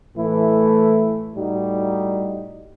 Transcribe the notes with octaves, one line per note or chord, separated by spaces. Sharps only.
A2 E3 A3 E4
A2 G3 D#4 F#4